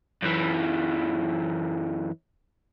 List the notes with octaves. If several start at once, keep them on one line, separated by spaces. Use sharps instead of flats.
F#2 E3